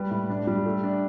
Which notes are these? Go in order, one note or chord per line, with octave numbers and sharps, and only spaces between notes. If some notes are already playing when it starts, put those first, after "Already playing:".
Already playing: G3 B4
A2
D4
G3
A3
D4